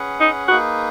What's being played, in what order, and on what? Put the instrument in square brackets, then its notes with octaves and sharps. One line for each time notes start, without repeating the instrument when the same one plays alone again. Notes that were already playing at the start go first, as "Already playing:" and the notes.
Already playing: [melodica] C#4 G#4 B4 F#5
[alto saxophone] D#4
[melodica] A#3 D#4 G#4 B4 [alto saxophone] F#4